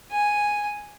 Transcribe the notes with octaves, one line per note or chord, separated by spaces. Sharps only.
G#5